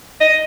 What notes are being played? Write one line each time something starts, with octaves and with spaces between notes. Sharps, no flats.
D#5